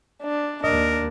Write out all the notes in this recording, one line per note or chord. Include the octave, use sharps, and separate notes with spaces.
D4
D#2 A#3 D4 A#4 D#5